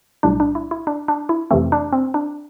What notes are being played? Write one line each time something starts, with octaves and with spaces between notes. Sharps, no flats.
B1 A2 G3 D4
D4
E4
E4
D4
D4
E4
F2 C3 E3 A3 C4
D4
C4
D4